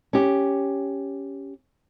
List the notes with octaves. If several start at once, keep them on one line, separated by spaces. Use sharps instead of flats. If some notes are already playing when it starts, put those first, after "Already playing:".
C#4 G4